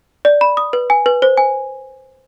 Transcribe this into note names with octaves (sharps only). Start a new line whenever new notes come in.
D5
B5
D#6
B4
G#5
B4
C5
G#5